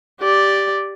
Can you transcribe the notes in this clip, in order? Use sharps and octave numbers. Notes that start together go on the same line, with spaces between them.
G4 D5